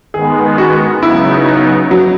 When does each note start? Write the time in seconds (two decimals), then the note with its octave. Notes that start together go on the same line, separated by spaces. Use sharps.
0.14 D#3 G#3 B3 G#4
0.58 F#4
1.02 C#3 F#3 B3 D#4 E4
1.91 F#3